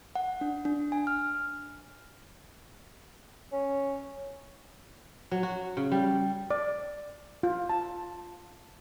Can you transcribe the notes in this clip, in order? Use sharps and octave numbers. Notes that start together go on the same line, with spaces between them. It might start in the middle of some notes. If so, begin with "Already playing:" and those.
F#5
D4
D4
G#5
F6
C#4
F#3
F#4
C#3
G3
D5
F4
A5